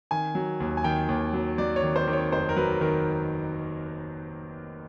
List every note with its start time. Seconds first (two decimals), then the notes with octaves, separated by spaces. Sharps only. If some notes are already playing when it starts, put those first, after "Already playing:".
0.11 D#3 G#5
0.35 F#3
0.60 D#2
0.77 G#5
0.84 D#3 G5
1.09 D#2
1.33 F#3
1.58 F#3 D5
1.76 C#5
1.83 D#3
1.96 C5
2.07 D#3
2.13 C#5
2.32 F1 C5
2.49 A#4
2.56 F#3 B4
2.81 D#3 A#4